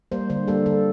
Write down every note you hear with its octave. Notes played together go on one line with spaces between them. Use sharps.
G3 A#3 C5
D3 C5
G3 A#3 A4
D3 A4